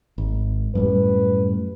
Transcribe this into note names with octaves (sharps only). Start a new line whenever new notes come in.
G#1
F#2 A2 G3 B4